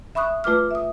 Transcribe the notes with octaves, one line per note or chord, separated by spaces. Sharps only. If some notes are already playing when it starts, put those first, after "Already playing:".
E5 B5 C#6 D#6 F#6
A3 F4 B4 D6 F6
E5 D#6